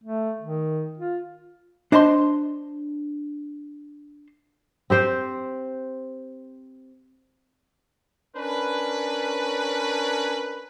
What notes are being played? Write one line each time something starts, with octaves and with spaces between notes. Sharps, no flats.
A3
D#3
F4
D4 C5 D#5 A5 B5 C6
C4 G4 C5 G5
C#4 D4 A#4 B4